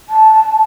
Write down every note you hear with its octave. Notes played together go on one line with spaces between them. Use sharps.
A5